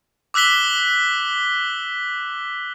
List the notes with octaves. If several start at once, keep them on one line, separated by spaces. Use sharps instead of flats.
D6 E6 F#6 B6 G7